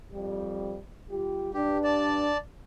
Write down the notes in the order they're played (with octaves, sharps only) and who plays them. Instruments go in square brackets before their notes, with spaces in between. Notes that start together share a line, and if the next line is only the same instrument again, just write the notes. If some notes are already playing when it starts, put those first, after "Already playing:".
[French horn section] F2 G3
G3 F4 G4
[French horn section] G2 D4 [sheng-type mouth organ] G4
[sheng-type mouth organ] D5 A5